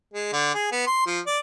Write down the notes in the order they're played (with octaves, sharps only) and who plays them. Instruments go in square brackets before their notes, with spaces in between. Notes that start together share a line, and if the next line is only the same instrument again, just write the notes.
[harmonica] G#3
D3
G#4
B3
C6
F3
D5